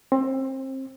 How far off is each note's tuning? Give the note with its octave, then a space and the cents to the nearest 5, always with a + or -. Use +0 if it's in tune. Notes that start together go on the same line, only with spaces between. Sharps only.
C4 +25